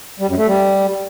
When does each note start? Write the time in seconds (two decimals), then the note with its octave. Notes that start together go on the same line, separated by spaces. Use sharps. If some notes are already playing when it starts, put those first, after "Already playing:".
0.20 G3
0.29 F#2
0.38 A3
0.47 G3